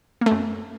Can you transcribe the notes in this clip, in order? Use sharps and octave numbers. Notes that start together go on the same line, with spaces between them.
F#2 A3 A#3